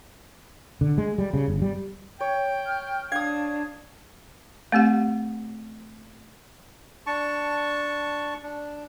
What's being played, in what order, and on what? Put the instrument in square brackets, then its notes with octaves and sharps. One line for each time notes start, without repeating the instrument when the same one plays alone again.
[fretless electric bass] D3
G#3
G3
C#3
G1
G3
[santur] C#5 [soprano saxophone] G5
[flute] F6
[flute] D4 [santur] F5 D#6 [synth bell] G#6
[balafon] A3 C4 G4 F#5
[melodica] D4 A5 C#6
D4